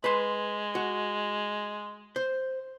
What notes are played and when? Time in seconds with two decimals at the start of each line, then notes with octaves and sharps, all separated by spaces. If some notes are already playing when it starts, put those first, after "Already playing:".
0.04 G#3 B4 C6
0.75 F#4
2.16 C5